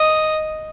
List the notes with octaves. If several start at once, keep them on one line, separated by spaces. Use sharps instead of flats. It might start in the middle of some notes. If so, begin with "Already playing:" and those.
Already playing: D#5